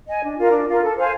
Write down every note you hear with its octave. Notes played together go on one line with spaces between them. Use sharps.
D#5 G#5
D4
F4 A#4
D4
F4 A#4
A4
C5 F5 G#5